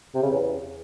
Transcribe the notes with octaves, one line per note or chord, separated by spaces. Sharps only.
C3
C#3
E2